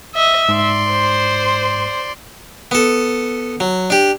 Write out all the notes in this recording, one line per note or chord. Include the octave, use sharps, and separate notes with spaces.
D#5 E5
G#2 D5 C6
C5
B3 A4
F#3
D4 G4